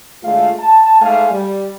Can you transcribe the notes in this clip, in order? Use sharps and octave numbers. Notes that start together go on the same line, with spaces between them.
D2 G#3 A3 F4 F5
A5
G#2 G#3 A3 F5 G#5
G3